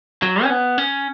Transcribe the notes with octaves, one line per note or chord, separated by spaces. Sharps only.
F#3
C#4
B3
C#4